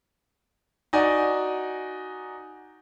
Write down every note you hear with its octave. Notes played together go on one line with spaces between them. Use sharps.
D#4 F#4 D5 G#5